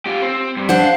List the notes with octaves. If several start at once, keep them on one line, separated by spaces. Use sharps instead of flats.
F4 G4
C4
G2
D4 C5 F#5
F5